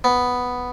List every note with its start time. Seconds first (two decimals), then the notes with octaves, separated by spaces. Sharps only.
0.04 B3